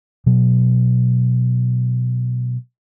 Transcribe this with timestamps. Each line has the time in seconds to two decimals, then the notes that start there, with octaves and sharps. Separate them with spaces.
0.26 B2 F#3